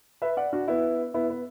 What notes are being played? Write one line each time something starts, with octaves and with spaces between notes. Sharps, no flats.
B4 E5
D5 F#5
D4 F#4
B3 E4
B3 E4
B3